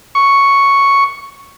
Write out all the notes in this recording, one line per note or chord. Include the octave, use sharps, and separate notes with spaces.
C#6